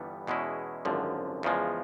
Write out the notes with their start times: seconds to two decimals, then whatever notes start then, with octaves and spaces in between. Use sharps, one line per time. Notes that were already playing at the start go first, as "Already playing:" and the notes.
Already playing: G1 G2 E3 G3 B3
0.27 E2 B2 G#3 C#4 E4
0.85 G#1 F#2 D3 F3
1.43 E2 C#3 F3 G#3